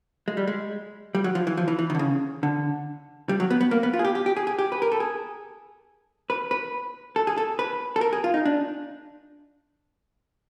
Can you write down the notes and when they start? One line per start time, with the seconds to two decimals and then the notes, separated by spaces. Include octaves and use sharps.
0.28 G#3
0.37 G3
0.47 G#3
1.15 G3
1.24 F#3
1.35 F3
1.47 E3
1.57 F3
1.68 E3
1.79 E3
1.90 D#3
1.95 D3
1.99 C#3
2.43 D3
3.29 G3
3.40 F#3
3.50 B3
3.61 B3
3.71 A#3
3.83 B3
3.93 F4
3.99 G#4
4.05 G4
4.15 G4
4.26 G4
4.37 G#4
4.47 G#4
4.59 G4
4.72 B4
4.82 A#4
4.92 A4
5.00 G#4
6.30 B4
6.51 B4
7.16 A4
7.27 G#4
7.38 A4
7.59 B4
7.96 A4
8.01 A#4
8.13 G#4
8.24 F4
8.34 D#4
8.45 D4